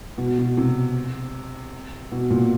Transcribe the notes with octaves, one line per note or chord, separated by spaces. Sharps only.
B2
B2
C3
B2
A#2